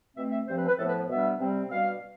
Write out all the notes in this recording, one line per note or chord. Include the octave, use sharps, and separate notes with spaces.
B2 A3 C4 E5
E5
G2 F3 C4 C5
B4
B4
A2 F3 B3 A4
B4
B2 G3 B3 D4 E5
C3 G3 C4
B2 G3 D4 F5